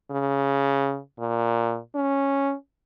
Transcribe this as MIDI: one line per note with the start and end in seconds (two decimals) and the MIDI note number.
0.11 0.99 49
1.19 1.79 46
1.95 2.54 61